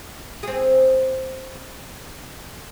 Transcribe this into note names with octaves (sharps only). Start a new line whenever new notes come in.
C4 G#4